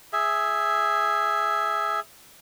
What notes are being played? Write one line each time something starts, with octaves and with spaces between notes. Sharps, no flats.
G#4 E5